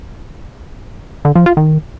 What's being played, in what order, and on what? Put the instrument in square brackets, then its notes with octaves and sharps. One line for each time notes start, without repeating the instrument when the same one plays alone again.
[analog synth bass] D3
F3
F4
D#3